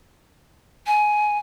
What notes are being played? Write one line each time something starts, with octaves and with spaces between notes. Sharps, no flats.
G#5